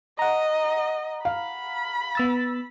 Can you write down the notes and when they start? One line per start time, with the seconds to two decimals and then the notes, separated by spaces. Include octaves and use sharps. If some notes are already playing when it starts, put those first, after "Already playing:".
0.19 D#5 F#5 A#5
1.25 F5 B5
2.15 B3 E6 A6